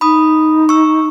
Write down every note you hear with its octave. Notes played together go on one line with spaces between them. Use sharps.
D#4 B5 D#6
C#6 E6